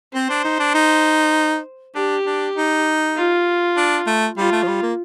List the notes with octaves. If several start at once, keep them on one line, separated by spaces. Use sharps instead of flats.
C4 C5
D4
D#4
D4
D#4
D4 G4
D4
D#4
F4
D4
A3
G3 F4
A3
F3
G3
A#3